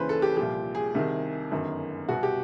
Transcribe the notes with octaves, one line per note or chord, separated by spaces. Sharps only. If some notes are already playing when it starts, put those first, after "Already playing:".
Already playing: D#2 C#3 E3 B4 C5
A4
G4
C2 A#2 F3 G4
G#4
C2 C3 D#3
G1 F#2 D#3
C2 B2 F#4
G4